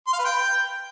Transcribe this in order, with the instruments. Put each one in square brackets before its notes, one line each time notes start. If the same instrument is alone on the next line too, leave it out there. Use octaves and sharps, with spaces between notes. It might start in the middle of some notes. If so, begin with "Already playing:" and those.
[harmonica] C6
F5
B4
G5